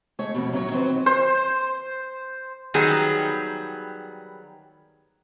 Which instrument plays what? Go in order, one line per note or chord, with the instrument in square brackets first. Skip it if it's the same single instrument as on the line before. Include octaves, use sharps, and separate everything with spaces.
[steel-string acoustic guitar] G#3 A3 C#5
F2 B2
F#2 A#2 F#3 C#5
D#3 F#3 C4 B4 C5
[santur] C5
[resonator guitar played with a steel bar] D#3 F#3 G3 B3 G#4